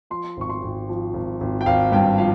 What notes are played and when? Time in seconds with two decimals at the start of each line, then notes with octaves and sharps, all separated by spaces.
0.10 F3 C6
0.37 G#1 C#6
0.50 C6
0.62 G#1
0.89 F3
1.14 G#1
1.41 G#1
1.61 G5
1.66 G#1 F5
1.92 G2 G5
2.18 F3 F5